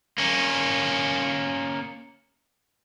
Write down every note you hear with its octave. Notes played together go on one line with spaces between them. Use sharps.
A#3 C#4